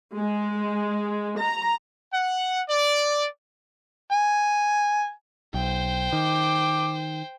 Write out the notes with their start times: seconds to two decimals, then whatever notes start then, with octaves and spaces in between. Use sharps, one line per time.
0.16 G#3
1.40 A#5
2.13 F#5
2.69 D5
4.12 G#5
5.54 B1 C5 G5
6.13 D#3 D6